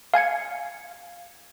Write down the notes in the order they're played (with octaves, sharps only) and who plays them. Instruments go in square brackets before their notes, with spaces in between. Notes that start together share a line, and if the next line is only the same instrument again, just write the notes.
[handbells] F5 G#5 G#6 C#7